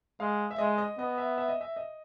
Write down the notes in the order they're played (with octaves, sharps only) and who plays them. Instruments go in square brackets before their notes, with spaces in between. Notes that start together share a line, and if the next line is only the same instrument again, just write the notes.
[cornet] G#3 [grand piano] F5
[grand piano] E5
[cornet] G#3 [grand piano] D#5
[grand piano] D#5
[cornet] B3 [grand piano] D#5
[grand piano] E5
E5
D#5
E5
D#5